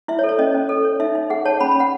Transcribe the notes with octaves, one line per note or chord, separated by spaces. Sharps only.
E4 E5
C#5
A4
C#5
C#4 D#5
C#4
A4
C#5
D#4 E5
D#4
G#4 F#5
C#5 A5
C#4 B5
B5
C#4 F#5